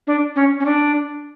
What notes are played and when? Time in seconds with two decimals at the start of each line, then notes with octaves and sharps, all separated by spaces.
0.07 D4
0.36 C#4
0.60 C#4
0.65 D4